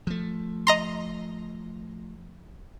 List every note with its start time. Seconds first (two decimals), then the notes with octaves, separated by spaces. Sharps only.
0.07 F3 A3
0.67 D#5 A#5 C6